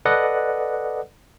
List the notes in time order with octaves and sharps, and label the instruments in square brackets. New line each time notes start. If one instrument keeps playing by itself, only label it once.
[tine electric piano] A4 B4 D5 D#5 F#5